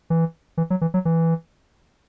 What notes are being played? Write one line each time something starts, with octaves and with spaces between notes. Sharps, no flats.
E3
E3
F#3
E3
F#3
E3